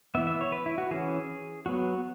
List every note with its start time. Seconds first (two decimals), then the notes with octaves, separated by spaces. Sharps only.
0.15 E3 B3 E5
0.27 E5
0.41 C#5
0.52 B4
0.66 E4
0.78 F#4
0.91 E3 C#4 G#4
1.66 F#3 B3 F#4